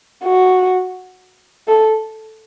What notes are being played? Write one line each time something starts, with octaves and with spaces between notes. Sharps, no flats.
F#4
A4